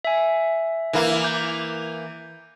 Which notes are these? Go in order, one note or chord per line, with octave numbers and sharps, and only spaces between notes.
E5 G#5
E3 A#3
D6 G6